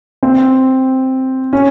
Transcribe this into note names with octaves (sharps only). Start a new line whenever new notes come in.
C4
C#4